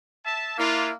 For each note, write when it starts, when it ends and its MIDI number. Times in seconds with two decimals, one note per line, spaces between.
0.25 0.56 76
0.25 0.56 81
0.58 0.92 58
0.58 0.89 62
0.58 0.92 64
0.58 0.89 65